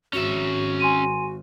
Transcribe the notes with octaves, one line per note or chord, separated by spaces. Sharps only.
G#1 C#4 F#4 E5
G#5 C6 D#7